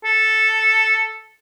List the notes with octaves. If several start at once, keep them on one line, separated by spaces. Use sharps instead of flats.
A4